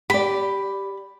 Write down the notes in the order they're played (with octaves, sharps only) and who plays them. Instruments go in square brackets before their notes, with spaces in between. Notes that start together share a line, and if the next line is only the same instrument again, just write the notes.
[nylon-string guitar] G4 D5 [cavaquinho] B5